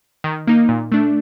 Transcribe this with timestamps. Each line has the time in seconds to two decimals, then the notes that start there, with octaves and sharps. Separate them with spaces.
0.24 D#3
0.47 A#3 D#4
0.69 A#2
0.92 A3 D4